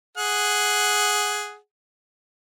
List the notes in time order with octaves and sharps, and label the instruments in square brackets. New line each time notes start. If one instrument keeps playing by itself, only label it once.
[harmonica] G#4 F#5